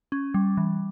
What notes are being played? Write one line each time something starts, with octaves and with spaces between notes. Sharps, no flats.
C#4
G3
E3